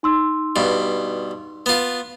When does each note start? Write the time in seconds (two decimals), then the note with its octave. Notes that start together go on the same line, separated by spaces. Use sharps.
0.03 D#4 C6 E6
0.56 G2 B2
1.66 B3 F4